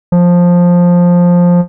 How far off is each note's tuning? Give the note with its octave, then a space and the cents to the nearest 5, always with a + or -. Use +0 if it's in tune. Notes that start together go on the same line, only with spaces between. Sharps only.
F3 +10